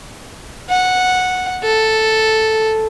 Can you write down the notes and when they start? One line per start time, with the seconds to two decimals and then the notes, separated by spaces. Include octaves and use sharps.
0.70 F#5
1.63 A4